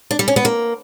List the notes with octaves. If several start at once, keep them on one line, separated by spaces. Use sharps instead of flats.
D4
G3
C#4
B3
A#3